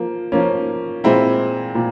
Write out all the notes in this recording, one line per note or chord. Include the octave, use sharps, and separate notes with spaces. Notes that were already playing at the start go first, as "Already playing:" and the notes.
Already playing: F3 A#3
F3 A#3 C#4
A#2 G#3 C4 E4
A#2